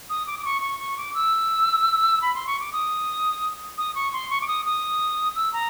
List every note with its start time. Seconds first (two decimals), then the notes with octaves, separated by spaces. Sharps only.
0.10 D#6
0.27 D6
0.39 D6
0.45 C#6
0.62 C#6
0.79 C#6
0.97 D6
1.15 E6
2.22 B5
2.35 C6
2.47 C#6
2.60 D6
2.73 D#6
3.78 D#6
3.95 C#6
4.13 C6
4.30 C#6
4.41 D6
4.48 D#6
4.66 D#6
5.36 E6
5.53 A#5